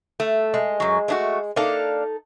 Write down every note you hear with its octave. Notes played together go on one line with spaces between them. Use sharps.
A3
G#3
F#2 F#3
A3 D4 F#4
A#3 D4 D#4 A4 F5